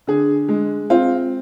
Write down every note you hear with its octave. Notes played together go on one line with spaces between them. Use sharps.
D3 G#4
G#3
C4 F4